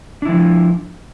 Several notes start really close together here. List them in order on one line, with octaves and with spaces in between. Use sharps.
D4 E4 F3